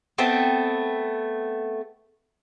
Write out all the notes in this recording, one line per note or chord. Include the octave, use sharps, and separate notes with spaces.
A3 B3 C4